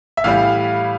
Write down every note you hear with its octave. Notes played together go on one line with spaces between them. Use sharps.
E5
A2 E3 G3 F5